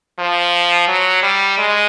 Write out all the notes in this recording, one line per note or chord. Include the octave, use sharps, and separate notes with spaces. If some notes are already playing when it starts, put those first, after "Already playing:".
F3
F#3
G3
G#3